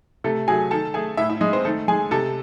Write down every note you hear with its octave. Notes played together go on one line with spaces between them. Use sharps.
C3 A3 A4
F#3 A3 G#4 G#5
D#3 A4 A5
A3 G#4 G#5
A2 E4 E5
E4 E5
G#3 D#4 D#5
C4 C5
D#3 A3 A4
G#3 G#4 G#5
C3 A4 A5